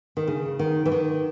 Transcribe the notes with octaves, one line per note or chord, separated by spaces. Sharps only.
D#3
C#3
D#3
E3
D#3